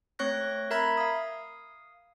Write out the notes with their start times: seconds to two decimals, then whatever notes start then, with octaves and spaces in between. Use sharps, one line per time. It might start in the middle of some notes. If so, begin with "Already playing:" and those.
0.19 A3 C4 C#5 C#6 F#6 A#6
0.71 A#4 E5 A#5 B5 G#6
0.97 F5 D#6